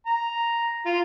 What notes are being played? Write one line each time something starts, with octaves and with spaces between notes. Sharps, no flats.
A#5
F4